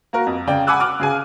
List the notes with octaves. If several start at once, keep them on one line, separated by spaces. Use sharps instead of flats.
A#3 F#4 A#4
F2
C#3 D5 G5
F#5 G#5 B5 D6 E6 F#6
D6 F6
C#3 G#4 G#5